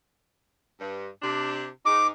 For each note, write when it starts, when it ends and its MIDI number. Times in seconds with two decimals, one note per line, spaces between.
0.80 1.07 43
1.22 1.66 48
1.22 1.66 62
1.86 2.11 44
1.86 2.11 63
1.86 2.07 86